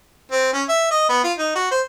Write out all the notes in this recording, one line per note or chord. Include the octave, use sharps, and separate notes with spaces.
C4
C#4
E5
D#5
B3
F4
D#4
F#4
C5